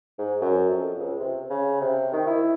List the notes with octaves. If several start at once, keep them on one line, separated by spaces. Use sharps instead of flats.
G#2
F#2
F2
C#2
C3
C#3
C3
D#3
E4